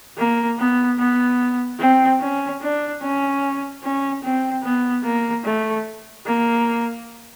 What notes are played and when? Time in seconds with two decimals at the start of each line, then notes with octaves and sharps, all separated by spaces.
0.17 A#3
0.58 B3
0.98 B3
1.79 C4
2.20 C#4
2.61 D4
3.02 C#4
3.83 C#4
4.23 C4
4.63 B3
5.04 A#3
5.44 A3
6.26 A#3